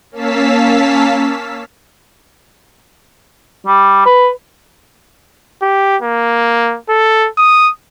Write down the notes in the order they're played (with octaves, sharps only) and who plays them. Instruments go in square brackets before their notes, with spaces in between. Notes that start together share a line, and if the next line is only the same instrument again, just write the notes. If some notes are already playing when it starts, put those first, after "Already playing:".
[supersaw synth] A#3 C#4 F5 A5 E6 B6
[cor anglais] G3
B4
[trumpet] G4
A#3
A4
D#6